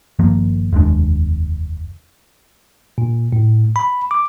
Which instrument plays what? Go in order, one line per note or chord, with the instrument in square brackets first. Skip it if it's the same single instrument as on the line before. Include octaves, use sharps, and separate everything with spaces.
[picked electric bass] G#1 G2 F3 A#3
F1 D#2 G#3 D4
[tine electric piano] A#2
A2
B5
D6